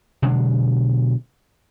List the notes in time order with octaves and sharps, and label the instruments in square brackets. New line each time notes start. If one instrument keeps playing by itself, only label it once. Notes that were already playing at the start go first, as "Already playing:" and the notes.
[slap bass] B2 D3 F#3 G#3